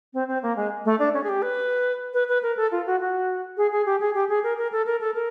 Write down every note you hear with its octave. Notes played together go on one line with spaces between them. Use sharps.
C4
C4
A#3
G#3
A3
D4
C#4
G#4
G4
B4
B4
B4
A#4
A4
F4
F#4
F#4
G#4
G#4
G4
G#4
G4
G#4
A#4
A#4
A4
A#4
A4
A#4